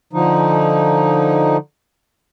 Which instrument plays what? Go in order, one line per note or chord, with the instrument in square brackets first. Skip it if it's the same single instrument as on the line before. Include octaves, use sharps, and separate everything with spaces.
[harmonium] D3 F3 D#4